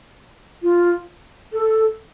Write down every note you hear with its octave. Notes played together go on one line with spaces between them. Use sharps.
F4
A4